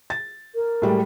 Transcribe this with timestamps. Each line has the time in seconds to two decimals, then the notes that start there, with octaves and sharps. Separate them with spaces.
0.10 A6
0.55 A#4
0.82 A2 G3 G#3